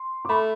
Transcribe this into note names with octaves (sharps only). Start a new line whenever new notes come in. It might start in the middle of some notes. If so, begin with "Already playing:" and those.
Already playing: C6
D6
A3 B5 C#6